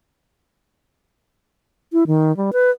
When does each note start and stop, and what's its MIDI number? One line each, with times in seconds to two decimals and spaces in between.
1.93 2.04 64
2.07 2.35 51
2.37 2.51 55
2.53 2.71 71